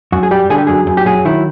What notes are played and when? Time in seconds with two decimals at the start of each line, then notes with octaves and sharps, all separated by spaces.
0.12 F#2 F#4
0.23 G#4
0.31 G3 G4
0.50 D3 G#4
0.58 G4
0.67 F#2 G#4
0.87 F#2
0.97 G4
1.06 F#3 G#4
1.25 D#3 E4